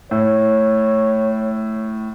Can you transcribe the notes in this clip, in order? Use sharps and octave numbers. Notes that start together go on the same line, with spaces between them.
A2 C#5